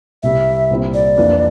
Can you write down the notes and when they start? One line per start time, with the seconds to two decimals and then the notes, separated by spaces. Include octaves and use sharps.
0.23 C2 C3 G3 E5
0.70 C2 A#2 G3 C4 E4
0.94 D5
1.17 F2 E3 A#3 D4